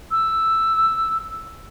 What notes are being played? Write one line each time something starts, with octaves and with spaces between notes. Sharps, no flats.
E6